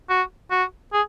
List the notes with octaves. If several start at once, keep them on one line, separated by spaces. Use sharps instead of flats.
F#4
F#4
G#4